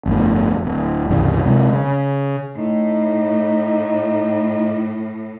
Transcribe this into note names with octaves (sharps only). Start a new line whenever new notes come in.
G1 F2 A2
D1
C#2 G2 C3 E3
C3 G#3
C#3
A2 D#4